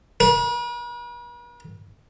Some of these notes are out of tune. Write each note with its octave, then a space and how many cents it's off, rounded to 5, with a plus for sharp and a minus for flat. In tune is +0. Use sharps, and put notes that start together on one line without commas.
B4 -45